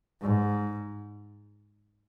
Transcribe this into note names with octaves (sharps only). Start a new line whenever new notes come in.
G#2